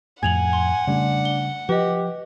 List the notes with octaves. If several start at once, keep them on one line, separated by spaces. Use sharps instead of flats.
F2 A2 F#5 G#5 G#6 F7 F#7
C6
C#3 G3 A3 D4
G7
F3 G4 B4 D#5